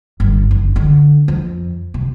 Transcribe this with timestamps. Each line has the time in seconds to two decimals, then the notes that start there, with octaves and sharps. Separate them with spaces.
0.20 G1
0.51 F#1
0.76 D3
1.28 F2
1.94 C3